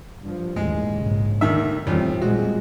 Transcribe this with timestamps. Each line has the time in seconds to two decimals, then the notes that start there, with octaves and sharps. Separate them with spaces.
0.22 G2 F3
0.56 A1 D#2 G#3
0.98 A#1 G#2 C#3
1.41 D#2 A2 D3 D#3 E5
1.87 A1 E2 F3 G3 C4
2.21 A#2 F3 G3 G#3 F#4